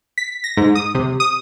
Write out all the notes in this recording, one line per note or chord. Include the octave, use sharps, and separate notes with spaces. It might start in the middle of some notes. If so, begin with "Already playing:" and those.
B6
A#6
G#2
D#6
C3
D#6